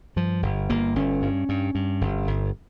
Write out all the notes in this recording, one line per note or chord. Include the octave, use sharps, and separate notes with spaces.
G2 F3
G1
G1 A#3
G1 C#4
G2
G2
G2
G1
G1